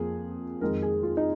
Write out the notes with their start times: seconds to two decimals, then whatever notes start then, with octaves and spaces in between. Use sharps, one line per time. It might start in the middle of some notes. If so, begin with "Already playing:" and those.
Already playing: F2 F3 A#3 G#4
0.61 F2 D#3 G#3 A#4
0.82 G#4
1.03 F4
1.17 D#4